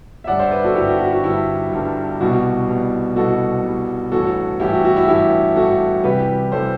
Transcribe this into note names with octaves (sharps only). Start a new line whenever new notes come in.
E5
G1 G2 D3 G3 D5 F#5
C5 E5
B4 D5
F#4 A4
G1 G2 D3 G3 E4 G4
F#4
F#4
F#4
G1 G2 D3 G3 E4
G1 G2 D3 G3
C2 B2 G3 F#4
C2 B2 G3
C2 B2 G3 F#4 A4
C2 B2 G3
A1 G2 E3 F#4 A4
A1 G2 E3 E4 G4
F#4
F#4
E4
A1 G2 E3 E4 G4
A1 G2 E3 F#4 A4
C2 C3 E3 G3 G4 B4
C3 E3 G3 A4 C5